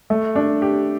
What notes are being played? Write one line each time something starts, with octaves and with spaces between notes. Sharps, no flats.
A3
D4
G4